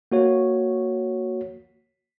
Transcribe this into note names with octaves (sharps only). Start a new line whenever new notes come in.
A#3 F#4 C#5